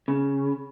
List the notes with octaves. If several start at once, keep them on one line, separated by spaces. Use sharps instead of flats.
C#3